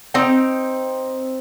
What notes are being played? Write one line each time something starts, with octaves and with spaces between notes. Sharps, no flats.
C4 D#4 G5